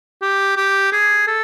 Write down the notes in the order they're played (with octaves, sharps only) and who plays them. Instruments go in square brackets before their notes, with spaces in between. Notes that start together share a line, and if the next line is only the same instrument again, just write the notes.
[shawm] G4
G4
G#4
A4